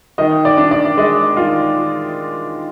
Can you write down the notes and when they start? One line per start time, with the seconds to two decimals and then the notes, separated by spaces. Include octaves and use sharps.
0.18 D#3 D#5
0.45 D5
0.57 D4
0.71 D5
0.97 G#3 D#5
1.37 D#3 F4